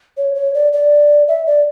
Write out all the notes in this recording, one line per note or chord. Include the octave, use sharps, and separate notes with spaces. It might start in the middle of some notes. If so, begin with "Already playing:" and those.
C#5
C#5
D5
D5
E5
D5